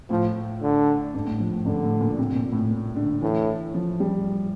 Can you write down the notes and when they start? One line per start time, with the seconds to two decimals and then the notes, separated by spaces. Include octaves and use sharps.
0.10 A2 F3
0.62 D3
1.14 G2
1.27 A2
1.40 F3
1.53 A2
1.66 G2 D3
1.83 A2
2.01 A#2
2.18 C3
2.35 A#2
2.53 A2
2.70 A#2
2.96 D3
3.22 A2 E3
3.74 F3
4.00 G3